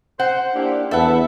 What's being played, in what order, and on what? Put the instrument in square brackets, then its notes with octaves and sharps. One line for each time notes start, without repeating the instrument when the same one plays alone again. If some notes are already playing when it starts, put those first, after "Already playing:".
[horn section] C5 [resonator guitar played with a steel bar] F#5
[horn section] A#3 E4 G4 [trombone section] D4
[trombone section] E2 B4 [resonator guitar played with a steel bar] A4 F#5 [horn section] E5